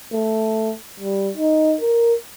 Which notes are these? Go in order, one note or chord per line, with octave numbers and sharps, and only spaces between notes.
A3
G3
D#4
A#4